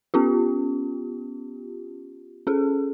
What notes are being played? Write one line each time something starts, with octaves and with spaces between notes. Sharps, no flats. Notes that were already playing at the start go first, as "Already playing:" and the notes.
B3 C#4 F4 G4
C#4 G#4 A4